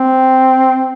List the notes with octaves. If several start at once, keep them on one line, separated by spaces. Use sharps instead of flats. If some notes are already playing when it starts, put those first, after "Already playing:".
Already playing: C4